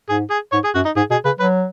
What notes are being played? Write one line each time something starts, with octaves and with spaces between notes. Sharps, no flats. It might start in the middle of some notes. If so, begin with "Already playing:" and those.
G#2 G#4
G#4
G#2 C#5
G#4
F#2 F#4
D#4
G#2 G#4
B2 G#4
C#3 B4
F#3 B4